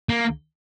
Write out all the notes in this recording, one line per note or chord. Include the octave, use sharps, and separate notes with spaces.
A#3